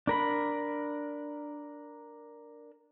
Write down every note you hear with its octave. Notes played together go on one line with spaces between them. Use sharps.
D4 A#4 B5